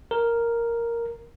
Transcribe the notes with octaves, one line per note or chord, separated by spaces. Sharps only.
A#4